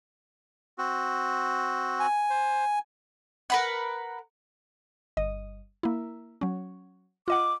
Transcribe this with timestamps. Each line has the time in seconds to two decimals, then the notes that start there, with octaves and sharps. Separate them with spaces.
0.78 C4 F#4
2.00 G#5
2.30 C5
3.50 A#4 B4 F#5
5.17 G1 D#5
5.83 A#3 E4
6.41 F#3 C#4
7.28 F4 D#5 F#5 D6